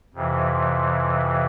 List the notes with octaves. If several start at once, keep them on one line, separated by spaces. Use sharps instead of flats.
F2 C3 E3